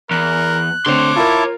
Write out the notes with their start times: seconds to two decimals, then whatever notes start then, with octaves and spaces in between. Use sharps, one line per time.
0.11 E2 A#4 F#6
0.86 D3 A3 C4 C#5 C6 D6
1.16 E4 F4 A#4 A5